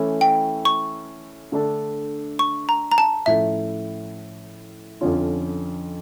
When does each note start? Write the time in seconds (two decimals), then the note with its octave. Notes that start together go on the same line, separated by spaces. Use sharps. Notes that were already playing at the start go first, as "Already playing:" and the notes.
Already playing: E3 A3 C#4 E4
0.21 G5
0.65 C#6
1.52 D3 A3 D4 A4
2.39 C#6
2.69 A#5
2.92 A#5
2.98 A5
3.26 A2 F3 A3 C#4 E4 E5
5.01 F2 D3 F3 C#4 F4